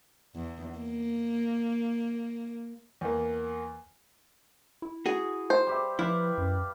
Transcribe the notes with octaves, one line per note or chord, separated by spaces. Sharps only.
E2
A#3
E2 A#3
E4
F#4 G#4
C5
G3 G4 E5
F3 E4 B4 D5 F5
F#2